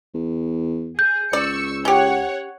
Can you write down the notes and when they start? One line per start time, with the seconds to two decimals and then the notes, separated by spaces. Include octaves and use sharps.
0.14 E2
0.99 G#4 G6
1.33 C#2 D5 C#6 E6 C#7
1.85 C#4 G4 C#5 F#5